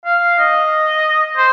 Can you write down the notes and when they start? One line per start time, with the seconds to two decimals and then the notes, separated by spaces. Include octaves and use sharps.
0.06 F5
0.39 D#5
1.37 C5